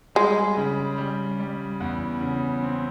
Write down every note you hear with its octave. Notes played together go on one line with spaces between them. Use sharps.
G3 G#3
C#3
G3
G3
E2
C#3
C4